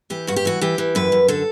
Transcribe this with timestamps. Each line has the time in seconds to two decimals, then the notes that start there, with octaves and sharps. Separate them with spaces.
0.10 E3 G4
0.27 G2 F#4
0.36 G4
0.45 E3 F#4
0.61 E3 G4
0.78 E3
0.95 F#2 B4
1.12 F#2
1.28 D3 A4